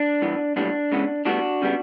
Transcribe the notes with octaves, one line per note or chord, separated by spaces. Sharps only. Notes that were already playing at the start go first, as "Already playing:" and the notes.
Already playing: D4
G2 E3 B3
B1 A2 G3 B3 D4
C#2 C#3 E3 B3
A2 G3 B3 D4 F#4
C#3 G3 B3